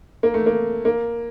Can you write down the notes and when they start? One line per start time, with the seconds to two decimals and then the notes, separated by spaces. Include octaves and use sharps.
0.23 A#3
0.34 A3
0.46 A#3
0.85 A#3